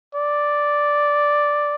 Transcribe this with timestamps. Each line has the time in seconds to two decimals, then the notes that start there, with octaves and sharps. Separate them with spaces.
0.15 D5